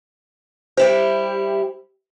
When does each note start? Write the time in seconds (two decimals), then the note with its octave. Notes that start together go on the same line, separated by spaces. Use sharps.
0.77 G3 E4 G4 C5